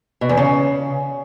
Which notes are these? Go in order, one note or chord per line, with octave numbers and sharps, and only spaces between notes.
B2
E2
C#3